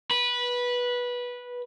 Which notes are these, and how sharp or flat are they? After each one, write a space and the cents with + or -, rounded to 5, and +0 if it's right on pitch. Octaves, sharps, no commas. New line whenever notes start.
B4 -15